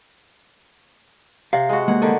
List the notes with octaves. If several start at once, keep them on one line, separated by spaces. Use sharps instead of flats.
C3 F5
G#3 F#4
G#3 A#3 B3 F#5
D3 D#3